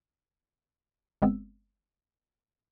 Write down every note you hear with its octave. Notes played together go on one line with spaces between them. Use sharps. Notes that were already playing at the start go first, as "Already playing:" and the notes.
G1 G#3 B3 C4 E6